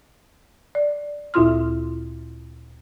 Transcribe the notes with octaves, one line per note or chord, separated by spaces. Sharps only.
D5
D2 A#2 E4 F4 C6 F6